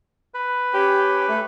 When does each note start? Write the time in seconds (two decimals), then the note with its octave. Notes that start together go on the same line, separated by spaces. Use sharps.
0.34 B4
0.74 C#4 G4
1.29 A3